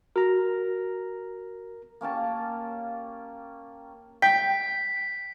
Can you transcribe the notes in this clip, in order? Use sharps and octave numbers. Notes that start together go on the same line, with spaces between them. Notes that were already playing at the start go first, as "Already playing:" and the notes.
F#4 A#4 A#5
A#3 C#4 G4 A5
G5 B6